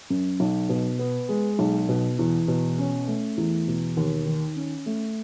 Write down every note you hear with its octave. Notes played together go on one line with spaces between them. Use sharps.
F#2
B1
B2
B3
G#3
B1
B2
E2
B2
C#4
A3
E2
B2
D#2
D#3
C#4
A3